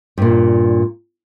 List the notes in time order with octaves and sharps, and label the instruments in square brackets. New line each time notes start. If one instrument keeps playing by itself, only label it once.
[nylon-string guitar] G2 A#2